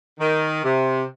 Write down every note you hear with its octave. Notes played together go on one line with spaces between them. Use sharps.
D#3
C3